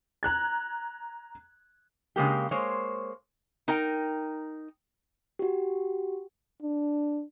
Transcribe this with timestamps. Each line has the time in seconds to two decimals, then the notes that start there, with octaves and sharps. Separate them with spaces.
0.23 A#5 F#6 G#6
2.16 C#3 G#3 A#3 G4
2.51 G#3 A#3 C5 C#5
3.68 D#4 A#4 G5
5.39 F#4 G4
6.62 D4